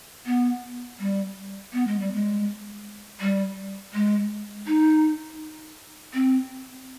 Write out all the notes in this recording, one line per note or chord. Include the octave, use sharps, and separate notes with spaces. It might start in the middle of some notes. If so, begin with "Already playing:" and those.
B3
G3
B3
G#3
G3
G#3
G3
G#3
D#4
C4